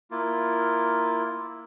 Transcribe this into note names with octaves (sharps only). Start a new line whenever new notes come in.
A#3 E4 F4